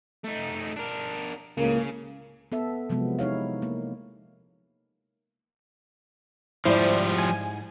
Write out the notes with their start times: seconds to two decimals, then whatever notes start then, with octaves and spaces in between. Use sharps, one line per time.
0.24 A3 D#4
0.76 D4 A#4
1.57 C#2 A2 C#3 A#3
2.52 B3 A4 E5
2.90 C3 F3 F#3 G#3 B3
3.19 D#4 E4 C#5 F5
3.62 A#3
6.65 G#2 F3 G3 E4 C5 D5
7.18 G#5